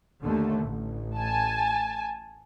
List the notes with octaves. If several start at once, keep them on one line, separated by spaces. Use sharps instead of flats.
D#2 D3 A3
A1
G#5 A5